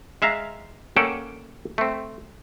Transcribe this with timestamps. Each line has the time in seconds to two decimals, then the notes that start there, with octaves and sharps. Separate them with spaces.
0.22 G#3 E5 F5 A#5
0.96 A#3 C#4 A4 D5 F#5 G5
1.78 A3 C4